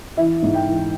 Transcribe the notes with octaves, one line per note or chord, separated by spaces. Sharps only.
E3 E5
G#2
G5
E3